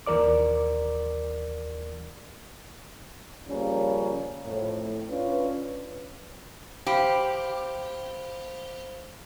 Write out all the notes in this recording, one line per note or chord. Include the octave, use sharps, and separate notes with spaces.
D#2 E3 A#4 D5 D6
C#3 F3 G3 A#3 C#4
F2 A2
C#4 D4 F4 B4
G4 C5 F5 B5